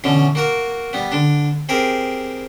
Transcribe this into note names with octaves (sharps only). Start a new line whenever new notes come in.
B2 D3 E3 C#4
A#3 F#4 A#4
G3 B3
D3 D4
C4 G4 G#4 A#4